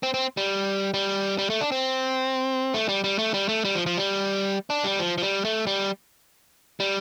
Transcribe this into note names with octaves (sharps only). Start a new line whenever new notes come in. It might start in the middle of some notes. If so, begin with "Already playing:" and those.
C4
C4
G3
G3
G3
A3
D4
C4
A3
G3
G3
A3
G3
A3
G3
F3
F3
G3
D4
G3
F3
F3
G3
A3
G3
G3